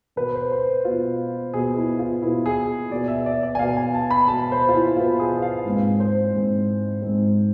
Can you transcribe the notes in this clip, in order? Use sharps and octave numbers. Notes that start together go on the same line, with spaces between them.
B2 B3 B4
C5
C5
B2 B3 F4
B2 B3 G#4
E4
F4
B2 B3 E4
G#4
B2 B3 D5
E5
D5
D5
G#5
B2 B3 F5
G#5
A5
B5
B2 B3 A5
C5
F4
E4
B2 B3 F4
G#4
F5
G#2 G#3 C4
C5
G#2 G#3 C4
G#2 G#3 C4